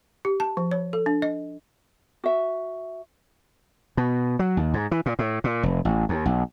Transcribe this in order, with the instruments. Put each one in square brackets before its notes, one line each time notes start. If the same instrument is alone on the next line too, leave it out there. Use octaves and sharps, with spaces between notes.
[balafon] G4
A5
F3
C#5
A4
D4
D#5
[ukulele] F#4 E5
[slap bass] B2
F#3
D#2
G#2
E3
A#2
A2
A#2
F1
A1
D#2
B1